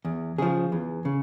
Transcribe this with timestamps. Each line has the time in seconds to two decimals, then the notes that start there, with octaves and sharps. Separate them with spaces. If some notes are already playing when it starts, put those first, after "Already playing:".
0.05 E2
0.38 C#3 F3 G#4
0.72 E2
1.05 C#3